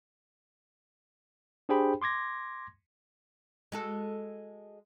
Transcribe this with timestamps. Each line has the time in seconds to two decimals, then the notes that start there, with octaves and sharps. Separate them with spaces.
1.69 D4 G4 G#4 C5 G5 B5
2.02 C6 D6 G#6 A#6
3.72 G#3 F#4 A4